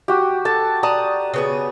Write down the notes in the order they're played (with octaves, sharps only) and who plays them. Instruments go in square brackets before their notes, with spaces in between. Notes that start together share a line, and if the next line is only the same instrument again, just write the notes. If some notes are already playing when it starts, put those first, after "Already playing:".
[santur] F#4 G4
[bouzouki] A4 [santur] A5
[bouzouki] D5 A5 A#5 [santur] D#6
[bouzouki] C#3 B3 G#4